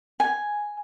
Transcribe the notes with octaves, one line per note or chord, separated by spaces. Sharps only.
G#5